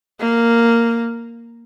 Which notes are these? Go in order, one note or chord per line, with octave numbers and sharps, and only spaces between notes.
A#3